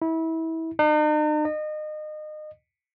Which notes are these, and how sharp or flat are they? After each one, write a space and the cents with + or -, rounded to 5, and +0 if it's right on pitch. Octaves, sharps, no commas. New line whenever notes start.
E4 -25
D#4 -45
D#5 -30